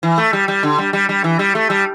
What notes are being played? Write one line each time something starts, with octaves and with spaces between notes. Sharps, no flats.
E3
A3
G3
G3
D3
G3
G3
G3
E3
G3
A3
G3